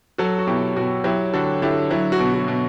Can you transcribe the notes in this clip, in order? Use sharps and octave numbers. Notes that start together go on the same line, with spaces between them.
F#3 F#4 A4
F#4
B2 E4 G4
B2 F#4
F#3 E4 G4
D3 F#4 A4
D3 E4 G4
F#3 E4
F#4
B2
F#4
B2